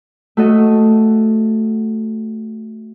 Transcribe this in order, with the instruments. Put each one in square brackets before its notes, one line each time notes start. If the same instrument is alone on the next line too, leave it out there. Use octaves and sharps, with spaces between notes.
[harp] A3 F#4 A4 D#5